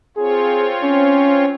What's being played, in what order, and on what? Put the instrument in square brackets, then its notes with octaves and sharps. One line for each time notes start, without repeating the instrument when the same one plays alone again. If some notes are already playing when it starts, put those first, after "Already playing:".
[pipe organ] C4 F4 C#5 [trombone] G#4
[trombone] C#4